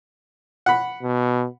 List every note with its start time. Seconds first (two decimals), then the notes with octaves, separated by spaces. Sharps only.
0.66 F#5 B5
1.02 B2